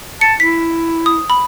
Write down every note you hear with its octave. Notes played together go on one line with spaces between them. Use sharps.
A5 C#7
E4 B6
D#6
B5